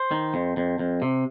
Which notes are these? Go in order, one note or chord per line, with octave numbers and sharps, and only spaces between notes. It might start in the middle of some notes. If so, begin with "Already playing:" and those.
Already playing: C5
D#3
F2
F2
F2
C3